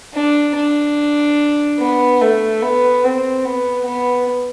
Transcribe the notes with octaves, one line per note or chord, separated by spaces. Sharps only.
D4
D4
B3
A3
B3
C4
B3
B3